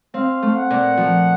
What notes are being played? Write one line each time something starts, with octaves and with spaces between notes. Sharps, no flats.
C4 F5
A3
F#5
A#2
F3